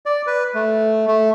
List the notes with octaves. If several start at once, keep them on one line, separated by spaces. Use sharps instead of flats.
D5
B4
A3
A3